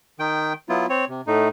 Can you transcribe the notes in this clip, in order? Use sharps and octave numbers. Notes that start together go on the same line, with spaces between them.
D#3 G5
F#3 B3 E4 F4
C4 C#5
C3
A2 A3 D#4